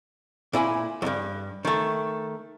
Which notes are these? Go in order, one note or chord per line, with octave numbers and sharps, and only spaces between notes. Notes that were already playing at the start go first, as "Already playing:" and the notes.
A#2 E4 G#5 B5
E2 G2
D#3 A3